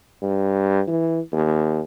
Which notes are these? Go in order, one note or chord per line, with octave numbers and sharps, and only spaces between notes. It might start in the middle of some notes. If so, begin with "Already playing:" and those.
G2
E3
D#2